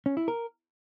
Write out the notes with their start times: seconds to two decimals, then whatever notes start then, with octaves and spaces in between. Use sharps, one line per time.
0.06 C#4
0.17 E4
0.28 A#4